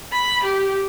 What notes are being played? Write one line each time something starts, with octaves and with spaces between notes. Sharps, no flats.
B5
G4